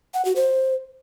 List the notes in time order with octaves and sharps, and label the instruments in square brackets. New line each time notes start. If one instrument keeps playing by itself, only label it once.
[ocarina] F#5
F#4
C5